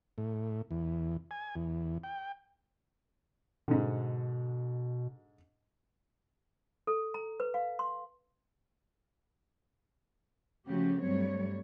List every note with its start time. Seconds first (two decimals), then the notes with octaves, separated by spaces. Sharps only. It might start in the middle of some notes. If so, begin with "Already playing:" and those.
0.18 A2
0.71 E2
1.31 G#5
1.56 E2
2.04 G5
3.68 G#2 B2 D3
6.87 A4
7.14 A#5
7.40 B4
7.54 F5
7.79 C6
10.66 C#3 F3 A3 C#4 F#4 G4
11.01 G2 F#3 G3 A3 C4 C#5